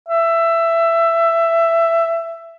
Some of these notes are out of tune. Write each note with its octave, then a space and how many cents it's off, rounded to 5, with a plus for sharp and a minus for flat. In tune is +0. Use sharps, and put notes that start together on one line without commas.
E5 +15